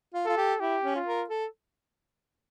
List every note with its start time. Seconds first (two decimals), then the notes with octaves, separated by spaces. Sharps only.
0.14 F4
0.26 F4 A4
0.38 G4
0.60 E4 G4
0.83 C#4
0.96 F4
1.07 A#4
1.30 A4